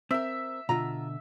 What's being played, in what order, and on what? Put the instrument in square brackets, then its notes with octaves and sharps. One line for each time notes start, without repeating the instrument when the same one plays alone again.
[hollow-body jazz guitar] C4 A#4 [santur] E5
[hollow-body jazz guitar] B2 D3 [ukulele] F4 A#5